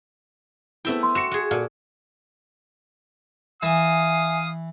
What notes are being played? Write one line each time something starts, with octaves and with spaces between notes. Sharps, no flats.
A3 B3 C4 E4 E5 G5
C6
F#4 C#7 E7
F#4 G#4
A#2 F4 F#4 A4
E3 E5 F5 G#5 D#6